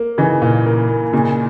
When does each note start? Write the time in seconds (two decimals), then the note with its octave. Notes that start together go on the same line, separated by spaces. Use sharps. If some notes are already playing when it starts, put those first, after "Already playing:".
Already playing: A#3
0.18 C#3 E3 D#4
0.42 A#2
0.66 A#4
0.90 A#3
1.13 A#2 C#3 D#4